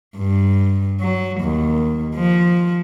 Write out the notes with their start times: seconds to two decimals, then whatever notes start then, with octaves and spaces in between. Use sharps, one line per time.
0.17 G2
1.00 F#3
1.41 D#2
2.16 F3